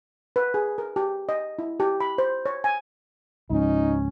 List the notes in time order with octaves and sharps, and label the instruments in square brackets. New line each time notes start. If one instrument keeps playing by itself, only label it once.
[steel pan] B4
G#4
A#4
G4
D#5
E4
G4
B5
C5
C#5
G#5
[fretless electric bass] C#2 G#2 F3 [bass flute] C#4 [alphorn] D#4